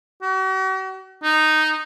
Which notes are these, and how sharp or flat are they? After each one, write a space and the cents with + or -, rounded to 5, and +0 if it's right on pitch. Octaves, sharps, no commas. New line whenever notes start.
F#4 +45
D#4 -5